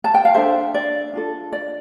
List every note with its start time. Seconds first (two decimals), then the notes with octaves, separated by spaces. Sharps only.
0.04 A5
0.14 G5
0.25 F5
0.34 D4 F4 A4 C5 E5
0.74 D5
1.13 D4 F4 A4
1.52 D5